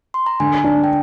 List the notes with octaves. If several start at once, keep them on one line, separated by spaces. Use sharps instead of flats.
C6
A#5
D3 G#5
D4
G5